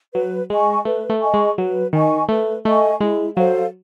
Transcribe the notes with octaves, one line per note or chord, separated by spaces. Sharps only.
F#3 B4
G#3 D#5 G#5 C#6
A3 B4
A3
D#5 G#5 C#6
G#3
F#3 B4
D#3 D#5 G#5 C#6
A3 B4
A3 D#5 G#5 C#6
G#3 E4
F#3 A4 C5 F5